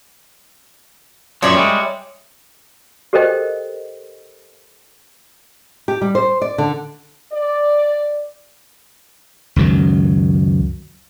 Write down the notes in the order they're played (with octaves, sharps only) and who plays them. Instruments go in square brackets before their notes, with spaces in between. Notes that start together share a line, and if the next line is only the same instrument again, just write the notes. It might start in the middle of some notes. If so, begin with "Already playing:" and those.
[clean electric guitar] F#2 A#2 F3 [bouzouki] C#5 D5 E5
[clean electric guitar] G3 G#3
[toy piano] G4 A4 A#4 C5 D#5 G5
[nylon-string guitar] G4
G3
C5
D5
D3
[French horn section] D5
[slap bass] C#2 F#2 D#3 F#3